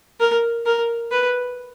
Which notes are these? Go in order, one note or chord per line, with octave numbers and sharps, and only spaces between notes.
A#4
A#4
B4